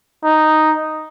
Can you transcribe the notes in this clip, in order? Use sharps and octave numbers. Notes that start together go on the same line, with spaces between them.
D#4